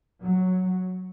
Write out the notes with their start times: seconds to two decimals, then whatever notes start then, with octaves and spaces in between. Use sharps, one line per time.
0.21 F#3